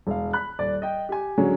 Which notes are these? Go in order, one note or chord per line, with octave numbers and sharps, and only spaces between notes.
E1 F5
B5 F#6
D#1 D5
D#5 G5
G4 G#5
D3 F#3 G#3 C#4